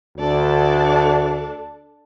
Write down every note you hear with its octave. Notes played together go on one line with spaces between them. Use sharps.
D2 D4 A4 D5